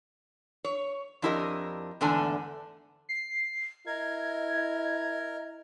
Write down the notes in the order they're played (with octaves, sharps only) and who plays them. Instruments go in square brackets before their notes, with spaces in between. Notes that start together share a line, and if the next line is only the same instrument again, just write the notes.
[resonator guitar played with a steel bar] C#5
F2 D4 E4 G4 A#4 D#5
E2 G#2 D3 A3 G#5 A5
[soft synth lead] C7
[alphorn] E4 [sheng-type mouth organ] A#4 [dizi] D#5 [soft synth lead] G#6